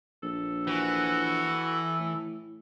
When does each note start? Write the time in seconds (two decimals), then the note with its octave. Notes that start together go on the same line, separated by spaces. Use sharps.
0.23 A#1 A4
0.67 E3 F#4
1.99 A2